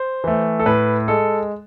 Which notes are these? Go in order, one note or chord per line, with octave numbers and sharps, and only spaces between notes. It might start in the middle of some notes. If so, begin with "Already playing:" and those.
Already playing: C5
E3 A3
A4
A2 B4
G#3 A4